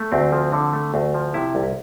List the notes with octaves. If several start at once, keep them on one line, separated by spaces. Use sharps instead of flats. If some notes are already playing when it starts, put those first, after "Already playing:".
Already playing: A3
D2 C4
F3
D3
A3
D2
F3
C3 E4
C2